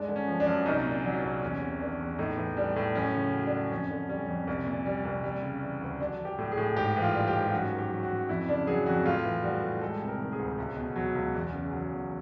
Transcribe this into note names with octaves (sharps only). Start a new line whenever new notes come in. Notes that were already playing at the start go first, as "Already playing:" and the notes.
Already playing: G2 G#3 D4
D3
C#4
F3
D4
F#2
C2 D#4
A#2
F#3 D4
C2
E2 C#4
C3
D#3 D4
E2
A2 D#4
E3
G3 D4
A2
F#2 C#4
C#3
F#3
D4
F#2
F2 C#4
D3
G3 C#4
F2
C2
A#2
G3
C2
G3
C#3
E3
D2
F#3 D4
F#3
G4
A2
G#4
A2
G#2 G4
E3
F4
G3
G4
G#2
F4
F#2 F#4
D#3
G4
F#3
F#4
F#2
F2 E4
C#3 D4
F#3 G#4
F2 F#4
A2 F4
E3
G3 F#4
A2
G#3 A4
C3
A#4
D#3
G#4
D2
C#2
B2
F#3
C#2
E2
C#3
F#3
E2